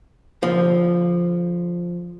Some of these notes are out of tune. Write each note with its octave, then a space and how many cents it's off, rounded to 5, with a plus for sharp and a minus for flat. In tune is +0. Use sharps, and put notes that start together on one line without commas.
D3 -35 F3 +0